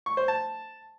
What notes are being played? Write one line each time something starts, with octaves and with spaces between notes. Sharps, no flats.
C#6
C5
A5